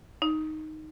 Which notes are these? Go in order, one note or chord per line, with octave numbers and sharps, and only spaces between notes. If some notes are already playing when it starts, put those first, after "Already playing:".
D#4